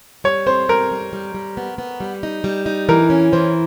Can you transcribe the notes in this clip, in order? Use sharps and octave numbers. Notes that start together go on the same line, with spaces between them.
G3 C#5
C4 C5
G3 A#4
G3
G3
G3
B3
B3
G3
D#4
G3
D#4
E3 A#4
C#4
E3 C5